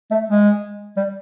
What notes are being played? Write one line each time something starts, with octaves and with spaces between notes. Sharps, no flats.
A3
G#3
G3